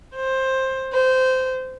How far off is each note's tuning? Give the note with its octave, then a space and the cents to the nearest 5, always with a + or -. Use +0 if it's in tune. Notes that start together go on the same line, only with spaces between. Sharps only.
C5 +15
C5 -15